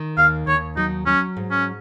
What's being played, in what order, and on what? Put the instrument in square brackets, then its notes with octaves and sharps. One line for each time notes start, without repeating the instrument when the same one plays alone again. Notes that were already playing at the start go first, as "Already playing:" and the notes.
Already playing: [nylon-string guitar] D#3
[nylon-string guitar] D#2 [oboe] F5
[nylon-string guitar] D#2 [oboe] C#5
[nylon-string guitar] F#3 [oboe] D#4
[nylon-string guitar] F#3 [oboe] C#4
[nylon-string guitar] G#2
[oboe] C#4